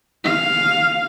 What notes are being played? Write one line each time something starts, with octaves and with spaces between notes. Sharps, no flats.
F5